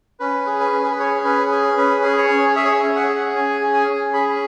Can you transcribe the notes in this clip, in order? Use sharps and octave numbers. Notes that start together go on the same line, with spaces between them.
C#4 B4
G#4
B4
C#4
G#4
B4
G#4 C#5
C#4 B4
G#4
C#4 B4
G#4
C#5
C#4
G#4 E5
C#5
E5
C#4
F#5
G#4
C#4 G#5
G#4
G#5
C#4
G#4 B5